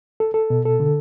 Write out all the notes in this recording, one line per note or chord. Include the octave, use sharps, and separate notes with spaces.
A4
A4
B2
A4
D3